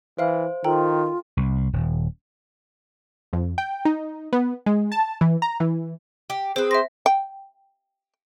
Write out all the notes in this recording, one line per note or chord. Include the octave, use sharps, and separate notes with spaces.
E3 C5 E5 F5 F6
D#3 F4 A4 G5 A#5
C2
D#1
F2
G5
D#4
B3
G#3
A5
E3
A#5
E3
G4
C4 G#4 B4 C5
C5 E5 A#6
G5